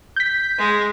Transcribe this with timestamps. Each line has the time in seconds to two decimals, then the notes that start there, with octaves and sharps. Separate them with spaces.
0.16 G6 B6
0.59 G#3